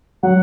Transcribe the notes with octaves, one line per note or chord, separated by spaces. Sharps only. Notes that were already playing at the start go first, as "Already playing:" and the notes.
F#3 F#5